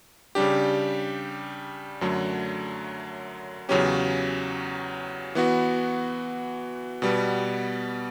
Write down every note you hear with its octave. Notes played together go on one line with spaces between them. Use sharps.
C#3 G3 D4 G4
F#2 D3 F#3 A3
E2 C#3 F#3 C#4 G4
E3 B3 F#4
B2 G3 B3